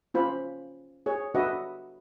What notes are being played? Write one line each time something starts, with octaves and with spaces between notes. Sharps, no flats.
C#4 F4 C5 B5
G#4 C#5
D4 F#4 B4 D#5 E5